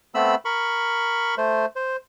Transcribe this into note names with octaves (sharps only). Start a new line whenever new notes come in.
A3 B3 C4 B5 E6
A#4 B5 C#6
A3 C5
C5